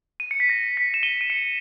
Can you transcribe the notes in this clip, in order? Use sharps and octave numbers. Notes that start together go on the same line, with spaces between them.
D#7
C#7
B6
A#6
B6
E7
D#7 G7
D#7
C#7 E7